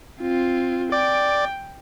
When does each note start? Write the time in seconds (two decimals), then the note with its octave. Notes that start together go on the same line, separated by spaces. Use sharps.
0.21 C4 F4
0.92 D5 G5